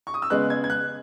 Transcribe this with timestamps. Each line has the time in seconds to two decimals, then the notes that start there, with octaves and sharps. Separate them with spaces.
0.07 C#6
0.14 D#6
0.22 E6
0.30 C#3 G#3 B3 F#6
0.50 G#6
0.64 G#6
0.70 F#6